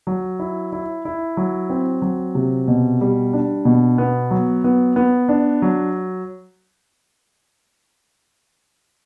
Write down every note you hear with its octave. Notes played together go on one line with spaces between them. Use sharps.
F#3
E4
E4
E4
F#3
C4
F#3
C3
B2
G3
D4
B2
B3
F#3
B3
B3
D4
F#3